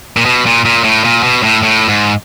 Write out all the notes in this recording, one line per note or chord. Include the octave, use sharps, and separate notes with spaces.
A#2
B2
A#2
A#2
A2
A#2
B2
A2
A2
G#2